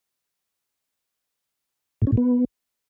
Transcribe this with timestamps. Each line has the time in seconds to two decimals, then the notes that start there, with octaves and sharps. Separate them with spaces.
2.02 A2
2.07 C#4
2.12 A2
2.17 B3